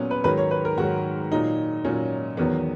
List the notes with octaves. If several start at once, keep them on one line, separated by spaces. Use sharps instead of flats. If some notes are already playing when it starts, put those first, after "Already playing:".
Already playing: A#2 F#3 B3 C#4
B4
G#2 D#3 F#3 B4
C#5
B4
A#4
G#2 D#3 F#3 F#4
A#2 F#3 D#4
A#2 F#3 C#4
E2 D#3 F#3 B3